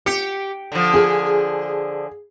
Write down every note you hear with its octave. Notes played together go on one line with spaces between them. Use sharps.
G4 C#7
D3 F3
G#4